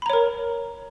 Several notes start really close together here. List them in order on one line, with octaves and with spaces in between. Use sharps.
B5 A#5 C#5 A#4